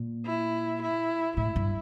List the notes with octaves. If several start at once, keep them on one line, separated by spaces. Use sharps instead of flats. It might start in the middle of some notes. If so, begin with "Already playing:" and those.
Already playing: A#2
E4
E4
A2 E4
G2